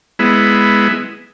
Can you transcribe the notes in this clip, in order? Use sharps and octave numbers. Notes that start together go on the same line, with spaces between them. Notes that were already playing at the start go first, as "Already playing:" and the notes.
G#3 B3 E4